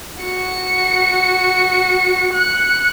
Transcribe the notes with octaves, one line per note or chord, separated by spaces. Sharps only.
F#4 C#7
F#6 C#7